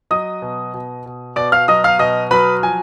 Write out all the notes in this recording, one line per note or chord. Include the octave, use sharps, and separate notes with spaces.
F#3 D#5 D#6
B2
B2
B2
B2 D5 D6
F5 F6
F#3 D#5 D#6
F5 F6
B2 D#5 D#6
F#3 B4 B5
F3 G#5